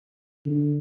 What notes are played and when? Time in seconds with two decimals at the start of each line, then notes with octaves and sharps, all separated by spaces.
0.46 D3